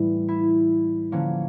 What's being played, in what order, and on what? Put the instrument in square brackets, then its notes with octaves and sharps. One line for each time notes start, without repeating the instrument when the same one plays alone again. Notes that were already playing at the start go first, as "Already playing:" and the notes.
Already playing: [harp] A2 E3 G3 E4
E4
D3 F3 A#3 C#4